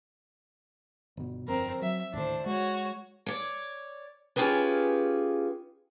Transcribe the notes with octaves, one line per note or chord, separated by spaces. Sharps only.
G1 B2
G1 F2 C4 A#4
F#3 E5
D#2 A2 D3 D4 C5
G#3 F#4 C#5
C#5 D5
C#4 D#4 F4 G4 G#4 B4